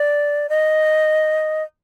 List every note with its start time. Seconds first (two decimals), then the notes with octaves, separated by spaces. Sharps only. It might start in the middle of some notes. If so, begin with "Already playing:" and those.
Already playing: D5
0.49 D#5